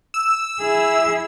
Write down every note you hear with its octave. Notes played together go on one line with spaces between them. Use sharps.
E6
E4 G#4